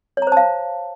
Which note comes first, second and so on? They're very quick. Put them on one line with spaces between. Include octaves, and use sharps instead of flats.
C#5 A#5 C5 A5 F5